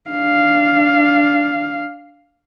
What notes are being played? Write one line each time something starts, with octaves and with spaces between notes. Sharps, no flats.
D4 F5